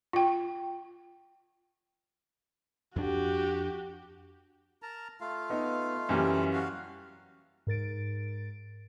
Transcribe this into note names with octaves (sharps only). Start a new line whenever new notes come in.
F4 G5
F2 D4 F#4 G4
A#4 A5 A#5
A3 F4 F5
B3 D#4
F#2 E3 G3
F#4 F5
G#2 A#4 A6 D7